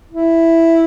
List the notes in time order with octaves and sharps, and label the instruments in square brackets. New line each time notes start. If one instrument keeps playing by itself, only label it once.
[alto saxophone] E4